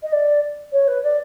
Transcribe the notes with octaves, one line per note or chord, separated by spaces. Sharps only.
D#5
D5
C#5
B4
D5